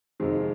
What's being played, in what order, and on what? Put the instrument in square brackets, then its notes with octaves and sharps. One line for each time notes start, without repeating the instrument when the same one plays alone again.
[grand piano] F2 C3 D#3 G#3